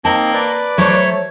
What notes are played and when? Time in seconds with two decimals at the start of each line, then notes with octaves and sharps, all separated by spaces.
0.05 A#3 C4 D#4 A5
0.34 B4 D5 D6
0.78 F#3 A3 C5 C#5